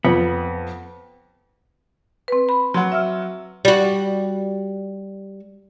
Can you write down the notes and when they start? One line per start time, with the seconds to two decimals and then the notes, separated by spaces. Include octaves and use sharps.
0.05 F2 B3
2.28 C4 B4
2.49 B5
2.74 F#3 F#5 C6
2.92 E5 E6 F6
3.65 G3 F#4